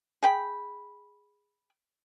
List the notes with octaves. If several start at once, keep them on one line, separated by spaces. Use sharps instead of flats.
G#4 G5 B5